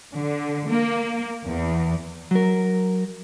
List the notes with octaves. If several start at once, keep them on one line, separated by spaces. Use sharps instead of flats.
D3
A#3
E2
F#3 A#4